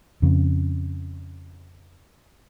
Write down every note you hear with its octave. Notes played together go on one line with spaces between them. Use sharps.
F2 C#3